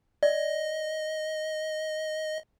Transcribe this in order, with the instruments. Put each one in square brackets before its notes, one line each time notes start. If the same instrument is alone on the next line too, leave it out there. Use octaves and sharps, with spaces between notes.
[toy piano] D5 [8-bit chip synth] D#5